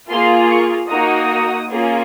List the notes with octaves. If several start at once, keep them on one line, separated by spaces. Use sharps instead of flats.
A#3 F4 G#4 C6
C#6
A#3 D#4 F#4 D#6
A#3 C#4 F4 G#4